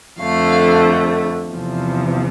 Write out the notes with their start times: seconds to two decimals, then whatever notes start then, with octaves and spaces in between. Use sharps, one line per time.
0.20 F2 D3 A3 F5
1.52 E2 C3 F3